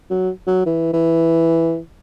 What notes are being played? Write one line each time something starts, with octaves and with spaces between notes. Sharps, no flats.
F#3
F#3
E3
E3